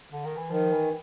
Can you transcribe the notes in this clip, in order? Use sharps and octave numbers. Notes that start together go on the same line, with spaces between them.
D3
D#3
E3
D#3 F3
E3